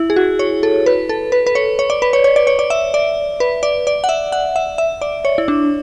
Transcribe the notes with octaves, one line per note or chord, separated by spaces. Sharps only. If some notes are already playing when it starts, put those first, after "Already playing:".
Already playing: E4
G#4
F#4
C#5
A4
B4
A4
B4
B4
C#5
C#5
D5
B4
C#5
C#5
D5
C#5
D5
E5
D5
B4
D5
D5
F#5
E5
F#5
E5
E5
D5
C#5
E4
D4